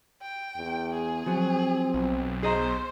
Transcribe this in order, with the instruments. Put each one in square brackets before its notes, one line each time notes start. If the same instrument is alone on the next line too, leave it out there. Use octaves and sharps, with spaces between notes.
[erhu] G5
[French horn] E2
[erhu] G#4
[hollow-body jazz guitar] F3 F#3 [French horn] C4
[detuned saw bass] B1
[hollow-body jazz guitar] G#4 D#5 A#5 [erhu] C5